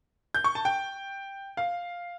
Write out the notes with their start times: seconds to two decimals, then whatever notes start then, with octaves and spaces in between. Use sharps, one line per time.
0.34 G6
0.44 C#6
0.55 A5
0.65 G5
1.57 F5